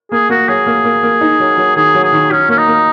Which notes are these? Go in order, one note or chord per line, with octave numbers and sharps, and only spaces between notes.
A#3 G#4
A#3 F#4
F#3 G#4
A#3
A#3
A#3
D#4
F#3
F#3
D#3 G#4
F#3
G#4
D#3
F#3 C#4
A#3 C#4
D#4
A#3